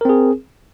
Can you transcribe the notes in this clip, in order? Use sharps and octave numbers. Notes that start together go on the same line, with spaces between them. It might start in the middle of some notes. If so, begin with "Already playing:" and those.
C4 G#4 A#4